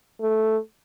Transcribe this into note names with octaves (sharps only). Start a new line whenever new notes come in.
A3